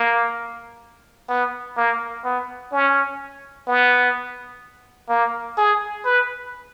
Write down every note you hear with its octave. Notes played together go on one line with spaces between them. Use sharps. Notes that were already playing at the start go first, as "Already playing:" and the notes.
Already playing: A#3
B3
A#3
B3
C#4
B3
A#3
G#4
B4